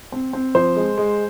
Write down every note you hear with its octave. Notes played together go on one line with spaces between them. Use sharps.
C4
C4
F3 C5
G#3
G#3